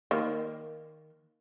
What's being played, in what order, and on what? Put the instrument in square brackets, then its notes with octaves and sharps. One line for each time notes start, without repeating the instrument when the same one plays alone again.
[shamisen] D#3 A#3